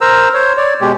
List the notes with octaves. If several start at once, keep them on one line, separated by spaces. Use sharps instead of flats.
A#4 C5 A#5 E6
C5 C#5
C#5 D5
B2 G#3 G4